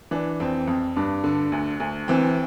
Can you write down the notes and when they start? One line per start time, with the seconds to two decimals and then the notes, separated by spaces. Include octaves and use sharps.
0.11 E3 D4
0.40 F2 C4
0.68 F2
0.96 G2 D4
1.24 D3
1.52 D2
1.80 D2
2.08 E3 C4